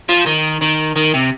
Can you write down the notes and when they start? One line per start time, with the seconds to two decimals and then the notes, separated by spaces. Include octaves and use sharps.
0.09 F3
0.26 D#3
0.61 D#3
0.96 D#3
1.14 C3